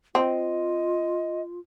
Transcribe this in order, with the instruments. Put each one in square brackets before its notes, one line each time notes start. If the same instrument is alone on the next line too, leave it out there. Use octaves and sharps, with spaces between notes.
[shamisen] C4 [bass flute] F4 [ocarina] D#5